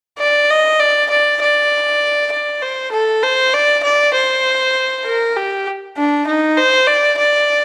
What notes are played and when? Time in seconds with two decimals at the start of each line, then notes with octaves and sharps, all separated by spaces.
0.19 D5
0.50 D#5
0.80 D5
1.10 D5
1.41 D5
2.32 D5
2.62 C5
2.92 A4
3.23 C5
3.54 D5
3.84 D5
4.15 C5
5.05 A#4
5.36 G4
5.97 D4
6.27 D#4
6.57 C5
6.87 D5
7.18 D5